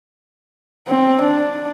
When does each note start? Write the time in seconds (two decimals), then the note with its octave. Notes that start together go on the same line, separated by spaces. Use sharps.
0.88 C4
1.21 D4